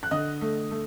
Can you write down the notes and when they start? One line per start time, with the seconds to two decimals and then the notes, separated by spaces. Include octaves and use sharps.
0.03 F#6
0.11 D3 D#5 D#6
0.41 A3
0.71 A3